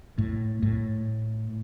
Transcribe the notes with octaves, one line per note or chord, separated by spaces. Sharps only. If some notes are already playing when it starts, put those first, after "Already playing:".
A2
A2